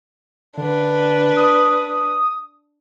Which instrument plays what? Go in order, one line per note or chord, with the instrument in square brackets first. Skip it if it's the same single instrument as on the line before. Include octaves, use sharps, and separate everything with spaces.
[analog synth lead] D3 [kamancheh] D4 B4
[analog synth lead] D#6